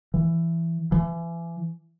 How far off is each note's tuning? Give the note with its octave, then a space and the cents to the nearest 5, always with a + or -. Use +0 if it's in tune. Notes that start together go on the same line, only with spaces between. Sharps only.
E3 +15
E3 +30